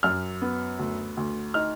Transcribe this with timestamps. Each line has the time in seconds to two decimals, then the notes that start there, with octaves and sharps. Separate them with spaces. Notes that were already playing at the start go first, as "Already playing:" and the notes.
0.03 F#2 F6
0.42 B3
0.79 D2
1.17 D2
1.54 D#4 F6